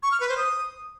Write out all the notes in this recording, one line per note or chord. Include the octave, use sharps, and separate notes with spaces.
C#6
F6
B4
C5
D#6